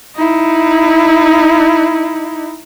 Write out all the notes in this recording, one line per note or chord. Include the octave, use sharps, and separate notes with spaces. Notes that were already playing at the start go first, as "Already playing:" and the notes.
D#4 E4